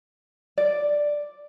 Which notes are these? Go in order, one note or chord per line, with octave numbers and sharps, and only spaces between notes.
D5